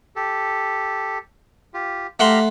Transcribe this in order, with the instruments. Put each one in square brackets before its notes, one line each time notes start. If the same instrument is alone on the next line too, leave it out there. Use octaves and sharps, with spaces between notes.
[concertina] G4 A4
F4 G4
[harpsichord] A3 F#5 C6 [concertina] G4 F5 A#5